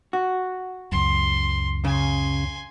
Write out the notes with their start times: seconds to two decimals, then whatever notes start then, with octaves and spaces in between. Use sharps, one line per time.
0.13 F#4
0.92 C#2 F#2 C6
1.85 C#3 G#5 C6